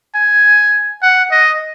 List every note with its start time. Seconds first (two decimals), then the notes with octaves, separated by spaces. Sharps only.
0.15 G#5
1.02 F#5
1.31 D#5